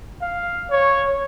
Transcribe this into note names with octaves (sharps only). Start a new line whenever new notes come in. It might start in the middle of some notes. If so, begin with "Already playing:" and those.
F5
C#5